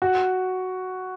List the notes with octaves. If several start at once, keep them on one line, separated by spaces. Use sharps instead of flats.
F#4